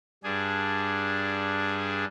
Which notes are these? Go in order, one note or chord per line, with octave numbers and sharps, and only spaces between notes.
G2 D4 G#4